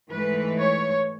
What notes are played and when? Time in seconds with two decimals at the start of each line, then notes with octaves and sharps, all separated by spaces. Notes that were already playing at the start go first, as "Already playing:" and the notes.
0.11 G#2 E3 A3 B4
0.59 C#5